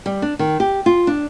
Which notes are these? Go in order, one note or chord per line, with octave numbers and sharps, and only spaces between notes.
G3
D4
D#3
G4
F4
D4